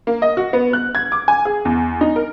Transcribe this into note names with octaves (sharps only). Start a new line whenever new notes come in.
A#3
D#5
F#4
B3
F#6
G#6
D6
G#5
G#4
E2
D#4
A#4